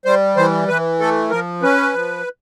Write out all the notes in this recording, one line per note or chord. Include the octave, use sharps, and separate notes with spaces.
G3 C5
E3 C5
E3 B4
A3 A4
F3 A#4
C#4 B4
F3